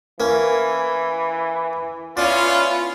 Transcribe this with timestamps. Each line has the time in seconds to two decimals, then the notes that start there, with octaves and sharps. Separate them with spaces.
0.20 E3 A#3 C#4
2.17 B3 C#4 E4 F4 D5